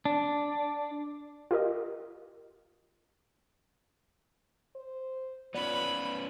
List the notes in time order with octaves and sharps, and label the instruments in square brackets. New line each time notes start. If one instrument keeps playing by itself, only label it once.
[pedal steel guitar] D4
[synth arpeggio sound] F4 G4 A#4 D#5
[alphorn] C5
[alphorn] F3 [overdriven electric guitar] B3 C#4 [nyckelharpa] B4 B5 [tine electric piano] D5